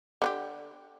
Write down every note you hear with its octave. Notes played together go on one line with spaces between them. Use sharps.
D3 C#4 G4